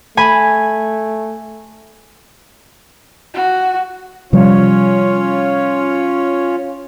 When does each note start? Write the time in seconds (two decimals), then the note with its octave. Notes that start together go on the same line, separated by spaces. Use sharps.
0.17 A3 G#5 B5
3.34 F#4
4.33 C3 F3 G3 C#4 F4 C#5